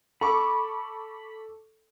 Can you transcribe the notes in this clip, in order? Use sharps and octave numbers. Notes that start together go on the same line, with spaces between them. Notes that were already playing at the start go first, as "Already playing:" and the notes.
A4 B5 C#6 D6